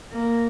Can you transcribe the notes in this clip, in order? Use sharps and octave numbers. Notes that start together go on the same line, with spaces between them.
A#3